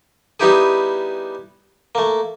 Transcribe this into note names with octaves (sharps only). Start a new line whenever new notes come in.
G3 B3 D#4 E4 G4 G#4
A3 A#3